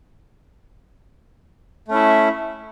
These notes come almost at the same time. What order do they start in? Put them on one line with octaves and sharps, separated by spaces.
A3 C#4 E4